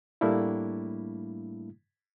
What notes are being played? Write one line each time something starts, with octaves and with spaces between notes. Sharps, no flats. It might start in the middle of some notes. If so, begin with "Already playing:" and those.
A2 G3 A3 A#3 D4 E4